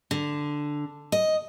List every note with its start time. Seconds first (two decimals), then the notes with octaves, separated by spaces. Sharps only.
0.11 D3
1.12 D#5